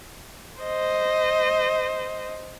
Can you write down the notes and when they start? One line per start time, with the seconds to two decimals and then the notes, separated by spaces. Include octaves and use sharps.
0.61 C5 D#5